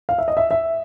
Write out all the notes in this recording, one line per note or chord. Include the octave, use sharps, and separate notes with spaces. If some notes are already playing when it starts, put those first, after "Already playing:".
F5
E5
D#5
E5
E5